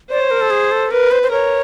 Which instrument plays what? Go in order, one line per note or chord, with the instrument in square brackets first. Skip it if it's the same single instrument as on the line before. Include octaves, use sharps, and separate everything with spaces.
[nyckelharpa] C5 [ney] D5
[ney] C#5
A#4
A4
G#4
A4
[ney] A#4 [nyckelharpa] B4
[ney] C5
C5
[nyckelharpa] A#4 [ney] C#5